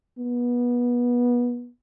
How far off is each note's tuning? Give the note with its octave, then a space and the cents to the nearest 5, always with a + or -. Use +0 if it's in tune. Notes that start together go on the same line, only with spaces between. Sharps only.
B3 -25